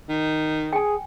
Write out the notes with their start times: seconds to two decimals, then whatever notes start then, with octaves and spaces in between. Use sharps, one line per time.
0.09 D#3
0.73 G#4 G5 G#5